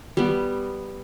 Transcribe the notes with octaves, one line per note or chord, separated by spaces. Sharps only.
G3 B3